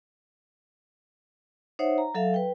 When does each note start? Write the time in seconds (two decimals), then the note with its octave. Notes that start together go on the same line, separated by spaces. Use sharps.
1.79 D#4 C5 C#5 E5 F#5
1.98 A#5
2.15 F#3 A4 E5 F5
2.34 B4 G5